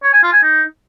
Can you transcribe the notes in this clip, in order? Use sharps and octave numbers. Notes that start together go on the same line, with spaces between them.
C#5
G#5
F4
G#5
D#4